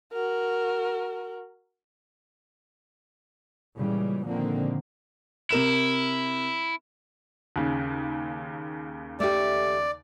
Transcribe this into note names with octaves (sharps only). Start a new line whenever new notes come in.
F#4 A#4
A#2 C#3 E3 G3 G#3
A#2 D3 D#3 F3 A#3 C4
C3 E4 A#4 E7
D#2 C#3
A3 G4 D5